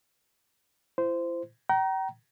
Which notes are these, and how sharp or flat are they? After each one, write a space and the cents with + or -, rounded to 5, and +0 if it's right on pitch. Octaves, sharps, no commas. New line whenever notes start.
E4 +40 C5 -15
G5 -40 A#5 +15